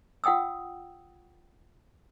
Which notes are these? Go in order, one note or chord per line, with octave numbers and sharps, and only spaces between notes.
F4 F#5 G5 D#6 E6